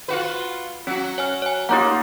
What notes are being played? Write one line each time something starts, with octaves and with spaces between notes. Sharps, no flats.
F4 F#4 B4
F#3 C#4 F#4
C#5 G#5 F6
C#5 G#5
A#3 D#4 F4 G4 C#5 F#5